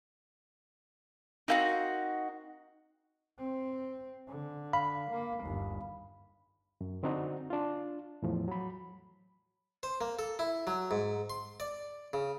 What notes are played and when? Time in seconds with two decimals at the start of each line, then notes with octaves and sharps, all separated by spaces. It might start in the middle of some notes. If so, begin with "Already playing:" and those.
1.48 C4 D#4 E4 F#4 A#4 F5
3.38 C4
4.28 D3
4.73 F5 B5
5.11 A#3
5.44 G1 D#2
6.81 F#2
7.03 D3 C4 D4 D#4 F#4
7.50 D4 F4
8.22 E2 A2 F3
8.48 F#3 B5
9.83 C5
10.01 A#3
10.19 A4
10.39 E4
10.67 F#3
10.91 G#2
11.30 C6
11.60 D5
12.13 C#3